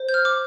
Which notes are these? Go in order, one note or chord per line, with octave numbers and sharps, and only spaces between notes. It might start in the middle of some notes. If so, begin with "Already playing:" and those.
Already playing: C5
G6
F6
D6